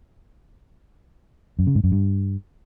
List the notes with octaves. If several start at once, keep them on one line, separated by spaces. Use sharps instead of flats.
F#2
C#3
G#2
F#2
G2